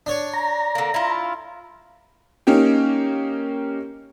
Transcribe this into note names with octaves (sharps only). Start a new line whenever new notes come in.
D4 C#5
A#5
D3 A#3
E4 F4
A#3 C#4 D#4 G4